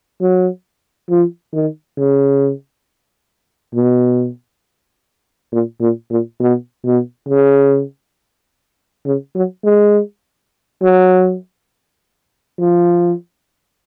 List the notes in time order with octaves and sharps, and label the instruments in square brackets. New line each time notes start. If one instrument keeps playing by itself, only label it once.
[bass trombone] F#3
F3
D#3
C#3
B2
A#2
A#2
A#2
B2
B2
C#3
C#3
F#3
G#3
F#3
F3